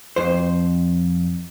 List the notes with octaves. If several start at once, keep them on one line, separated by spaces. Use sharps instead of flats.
F2 C5